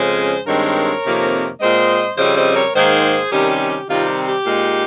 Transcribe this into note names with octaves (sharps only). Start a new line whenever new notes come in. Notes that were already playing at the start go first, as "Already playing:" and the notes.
Already playing: F2 C#3 G#3 C#4 G#4 C5
G2 D#3 G#3 C4 A#4 C#5
F2 C3 D#3 A#3
A#2 G#3 C4 C5 D#5
F2 C#3 G3 C4 C5 D#5
C5 D#5
A#4 C#5
G#2 D#3 A#3 G#4 C5
C3 D#3 G3 C#4 G4 A#4
G4
G4
C3 D#3 G3 C4 D#4 F4
G4
G4
A#2 G#3 D#4